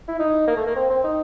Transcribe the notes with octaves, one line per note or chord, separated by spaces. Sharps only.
E4
D#4
A#3
A3
A#3
C4
C4
D#4